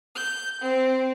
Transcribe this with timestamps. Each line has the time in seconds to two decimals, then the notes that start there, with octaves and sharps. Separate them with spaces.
0.14 G6
0.61 C4